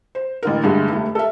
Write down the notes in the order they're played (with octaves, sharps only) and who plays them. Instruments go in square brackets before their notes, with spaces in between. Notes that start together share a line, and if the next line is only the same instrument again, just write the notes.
[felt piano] C5
A1 D3 A#4
G2 D3 G#3 A3
F1 A3
A4 A#4 E5